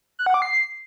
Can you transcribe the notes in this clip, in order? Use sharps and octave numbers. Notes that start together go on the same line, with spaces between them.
F#6
F#5
D6
C7